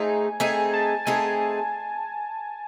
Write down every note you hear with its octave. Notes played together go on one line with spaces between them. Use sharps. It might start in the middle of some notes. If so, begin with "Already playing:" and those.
Already playing: A3 C4 D#4 G#4 G#5
A3 C4 D#4 G#4 G#5
A5
A3 C4 D#4 G#4 G#5